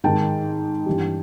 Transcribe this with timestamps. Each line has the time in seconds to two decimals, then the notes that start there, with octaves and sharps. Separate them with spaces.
0.04 G#2 D#3 G#3 G5 A5
0.86 G2 E3 G3